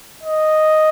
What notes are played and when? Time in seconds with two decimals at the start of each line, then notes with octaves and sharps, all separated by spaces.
0.23 D#5